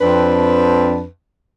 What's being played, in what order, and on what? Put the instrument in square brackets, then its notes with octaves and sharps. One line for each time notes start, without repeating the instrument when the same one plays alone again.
[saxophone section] F2 C4 D4 B4